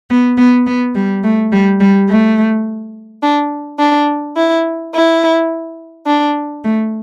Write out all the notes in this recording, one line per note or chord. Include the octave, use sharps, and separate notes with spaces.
B3
B3
B3
G3
A3
G3
G3
A3
D4
D4
E4
E4
D4
A3